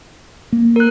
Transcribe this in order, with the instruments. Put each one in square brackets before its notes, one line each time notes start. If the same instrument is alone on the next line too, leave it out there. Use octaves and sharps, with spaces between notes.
[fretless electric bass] A#3
[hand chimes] A#4 F#6